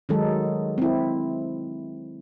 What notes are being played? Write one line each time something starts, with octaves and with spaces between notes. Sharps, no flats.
D#3 F#3 G#3 D#4 A4
C4 E4